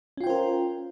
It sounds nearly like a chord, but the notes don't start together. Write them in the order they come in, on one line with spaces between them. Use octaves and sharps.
C#4 F4 G5 C5 A#4